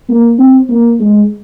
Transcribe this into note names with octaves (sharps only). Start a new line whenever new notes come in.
A#3
C4
A#3
G#3